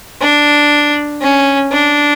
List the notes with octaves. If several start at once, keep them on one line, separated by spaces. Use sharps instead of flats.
D4
C#4
D4